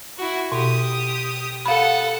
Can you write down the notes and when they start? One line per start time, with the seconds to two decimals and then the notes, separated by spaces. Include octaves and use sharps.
0.18 E4 F#4
0.52 B2 G4 D#6
1.66 A4 F5 F#5 B5